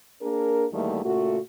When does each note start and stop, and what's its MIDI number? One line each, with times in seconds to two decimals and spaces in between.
0.21 0.65 58
0.21 0.65 62
0.21 0.65 68
0.21 0.65 70
0.72 1.04 40
0.72 1.04 51
0.72 1.04 55
0.72 1.04 57
0.72 1.04 58
1.04 1.39 46
1.04 1.39 49
1.04 1.39 57
1.04 1.39 66